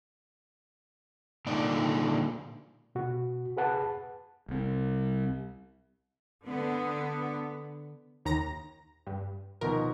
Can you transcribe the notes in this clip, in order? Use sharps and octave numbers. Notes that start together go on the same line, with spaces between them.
A#2 D3 D#4 D5
B2 F#4
G#4 B4 F#5 A5
C2 C4
D3 B3
D#2 A#5 A#6
G2
B2 D#3 F3 A#4